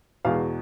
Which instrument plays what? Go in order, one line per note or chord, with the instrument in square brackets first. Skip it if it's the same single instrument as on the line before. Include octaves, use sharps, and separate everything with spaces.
[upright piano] E2 B2 G#3 F5